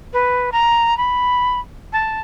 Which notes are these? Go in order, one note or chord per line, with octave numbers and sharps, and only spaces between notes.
B4
A#5
B5
A5